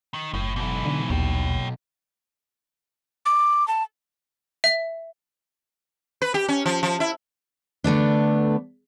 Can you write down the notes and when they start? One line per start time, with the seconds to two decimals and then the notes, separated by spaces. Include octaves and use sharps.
0.14 D#3
0.34 F#1 A2
0.56 B1 G#2 B2 E3
0.85 D3
1.10 A#1 D#2 C#5 G5
3.26 D6
3.68 A5
4.64 E5
6.22 B4
6.34 G4
6.48 C#4
6.66 F3
6.83 F3
7.00 E4
7.84 D3 A3 B3 D4